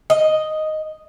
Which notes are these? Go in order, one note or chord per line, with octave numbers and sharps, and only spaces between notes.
D#5